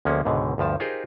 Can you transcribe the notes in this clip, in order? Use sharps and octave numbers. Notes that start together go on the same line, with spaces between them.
D2 F3 G#3 A#3 C#4
C#2 G#2 B2 D3
D2 G2 F3 A5
D#4 F4 G4 G#4 A#4 C5